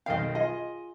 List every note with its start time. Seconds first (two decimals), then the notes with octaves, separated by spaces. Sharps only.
0.06 B1 D#3 D#5 F5 G5
0.35 F4 G#4 D#5